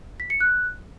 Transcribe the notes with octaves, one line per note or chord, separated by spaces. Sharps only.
B6
C#7
F#6